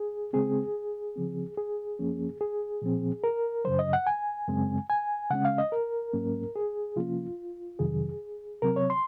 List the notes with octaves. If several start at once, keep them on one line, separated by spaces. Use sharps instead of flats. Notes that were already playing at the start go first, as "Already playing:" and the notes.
Already playing: G#4
C#3 G#3 C4 G#4
C#3 F3 C4
G#4
F#2 F3 A#3 C#4
G#4
A#2 F3 C4
A#4
F#2 C#3 F#3 C5
D#5
F#5
G#5
F#2 C#3 G#3 C4
G#5
C#3 G#3 C#4 F#5
F5
D#5
A#4
G#2 F#3 A#3 C#4
G#4
C3 F3 A#3 C#4 F4
F2 C3 D#3 F#3 G#4
C3 F#3 C4 A#4
C#5
C6